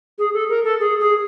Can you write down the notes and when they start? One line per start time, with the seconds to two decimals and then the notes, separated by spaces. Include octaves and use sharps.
0.19 G#4
0.33 A4
0.49 A#4
0.64 A4
0.80 G#4
1.00 G#4